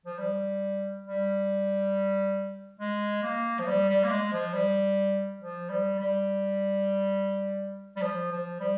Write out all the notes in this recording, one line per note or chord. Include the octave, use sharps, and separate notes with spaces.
F3
G3
G3
G#3
A#3
F3
G3
G3
A#3
G#3
F3
G3
F3
G3
G3
G3
F3
F3
G3